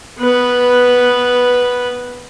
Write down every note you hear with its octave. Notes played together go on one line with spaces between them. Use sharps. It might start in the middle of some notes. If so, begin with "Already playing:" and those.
B3 B4